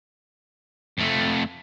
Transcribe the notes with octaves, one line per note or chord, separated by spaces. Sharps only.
F2 A3